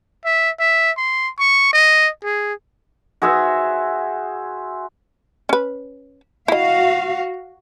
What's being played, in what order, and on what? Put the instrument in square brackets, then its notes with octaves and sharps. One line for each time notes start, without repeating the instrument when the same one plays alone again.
[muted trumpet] E5
E5
C6
C#6
D#5
G#4
[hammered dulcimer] F#4 G#4 C5 E5
[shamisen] C#4 B4
[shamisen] E4 D#5 [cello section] F#4 F5